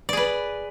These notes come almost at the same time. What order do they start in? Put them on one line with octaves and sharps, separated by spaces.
D5 G#4 B4